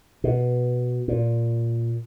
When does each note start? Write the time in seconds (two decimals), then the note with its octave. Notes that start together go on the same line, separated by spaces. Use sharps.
0.24 B2
1.08 A#2